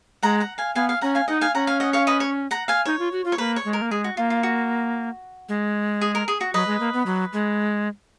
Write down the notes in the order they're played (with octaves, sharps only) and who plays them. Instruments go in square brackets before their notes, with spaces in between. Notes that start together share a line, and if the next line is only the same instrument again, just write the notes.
[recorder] G#3 [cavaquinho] F#5 A#5
[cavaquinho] F#5 A#5
F5 G#5
[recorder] B3 [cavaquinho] F5 G#5
[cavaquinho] F5 G#5
[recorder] C#4 [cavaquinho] F#5 A#5
[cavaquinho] F5 G#5
[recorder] D#4 [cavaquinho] D#5 F#5
[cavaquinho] F5 G#5
[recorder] C#4 [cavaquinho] F#5 A#5
[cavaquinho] F5 G#5
D#5 F#5
C#5 F5
B4 D#5
C#5
F#5 A#5
F5 G#5
[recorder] D#4 [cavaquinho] C#5
[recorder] F4
F#4
F4
[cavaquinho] C#5
[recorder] A#3 [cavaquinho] B4
[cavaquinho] C#5
[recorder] G#3
[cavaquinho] A#4
[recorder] A#3
[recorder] G#3 [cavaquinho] G#4
[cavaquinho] F#4
[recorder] A#3 [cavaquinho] F4
[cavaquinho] F4
F#4
[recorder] G#3
[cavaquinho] G#4
A#4
G#4
F#4
[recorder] F#3 [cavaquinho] B4 D#5
[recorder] G#3
A#3
B3
F#3
G#3